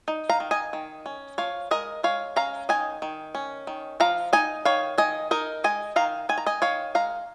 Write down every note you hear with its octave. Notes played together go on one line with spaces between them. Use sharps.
D#4
F5 A#5
D#3
D#5 G#5
D#3
C#4
F3 C#5 F5
G#3 A#4 D#5
G#3 C#5 F5
C#4 F5 A#5
D#3 D#5 G#5
D#3
C#4
D#3
F3 F5 A#5
D#4 D#5 G#5
D#3 C#5 F5
D#3 D#5 G#5
D#4 A#4 D#5
G#3 D#5 G#5
D#3 F5 A#5
D#3 G#5
A#5
D#5 G#5
D#3 C#5 F5
G#3 F5 A#5